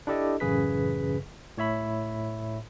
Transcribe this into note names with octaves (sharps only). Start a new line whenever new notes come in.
D4 E4 G4 A4 D5 D#5
A1 F#2 C#3 G#4 B4 B6
A2 C#5 E5 B5